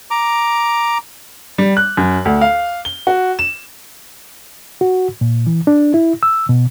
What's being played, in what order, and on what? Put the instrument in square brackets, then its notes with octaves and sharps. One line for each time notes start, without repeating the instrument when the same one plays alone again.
[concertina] A#5 D6
[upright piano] G3
F#6
F#2
D2
F5
G7
F#4
E7
[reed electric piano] F#4
A#2
E3
D4
E4
E6
B2